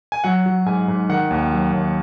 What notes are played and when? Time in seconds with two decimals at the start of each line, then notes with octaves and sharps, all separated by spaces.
0.12 G#5
0.24 F#3 F#5
0.46 F#3
0.66 G#2 G#5
0.88 G#2
1.09 D#3 F#5
1.31 D#2
1.52 F#3
1.72 D#2